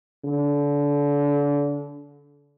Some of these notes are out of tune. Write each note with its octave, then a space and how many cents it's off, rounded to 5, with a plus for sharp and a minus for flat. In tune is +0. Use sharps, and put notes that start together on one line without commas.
D3 -30